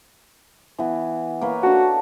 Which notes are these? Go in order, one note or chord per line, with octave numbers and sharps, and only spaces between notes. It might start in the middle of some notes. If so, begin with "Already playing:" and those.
E3 B3
A#3 B4 C#5
D4 F#4 A4